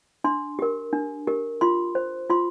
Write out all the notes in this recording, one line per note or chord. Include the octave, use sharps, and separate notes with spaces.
D4 C6
G4 A#4
D4
G4 A#4
F4 C6
C5
F4 C6